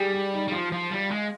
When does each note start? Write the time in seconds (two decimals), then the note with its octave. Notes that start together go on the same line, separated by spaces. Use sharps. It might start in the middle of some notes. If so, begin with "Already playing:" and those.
Already playing: G3 G4 G#4
0.14 G4
0.33 D#4
0.48 G3
0.52 F3 F4
0.72 F3
0.91 G3
1.11 G#3